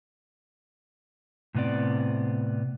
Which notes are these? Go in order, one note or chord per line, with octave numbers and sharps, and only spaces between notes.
A2 C3 B3 C4 D5